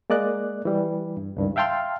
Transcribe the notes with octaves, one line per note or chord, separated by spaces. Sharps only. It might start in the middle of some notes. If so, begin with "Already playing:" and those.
G#3 A#3 D5 D#5 F#6
E3 G3
G2
C#2 G2 D#3
E5 F5 G5 A5 C6 F6